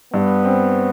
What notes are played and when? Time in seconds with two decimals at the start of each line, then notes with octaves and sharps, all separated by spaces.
0.13 G2 B3
0.45 C4